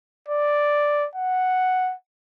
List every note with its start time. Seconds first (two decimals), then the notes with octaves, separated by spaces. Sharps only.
0.28 D5
1.15 F#5